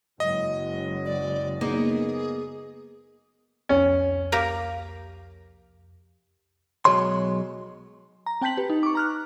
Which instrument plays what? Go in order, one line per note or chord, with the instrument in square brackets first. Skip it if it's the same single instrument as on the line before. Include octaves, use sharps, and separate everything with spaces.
[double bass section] F#1 F#3 G#3 [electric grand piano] D#5
[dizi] D5
[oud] A#3 B3 D#4 [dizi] G#4
[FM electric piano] C2 F2 [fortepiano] C#4
[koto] A#3 G4 A#4
[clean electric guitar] B1 A#2 F#3 G#3 C#5 C6
[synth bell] A#5
C4 G5 A5 G6 B6 F#7
G4 B4
D#4
C#6 D6
A#5 F6 F#6